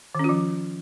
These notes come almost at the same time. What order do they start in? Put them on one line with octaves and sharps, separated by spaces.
D#3 C#4 F4 F3